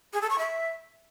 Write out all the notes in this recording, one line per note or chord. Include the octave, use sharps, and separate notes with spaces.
G#4
A4
C#6
E5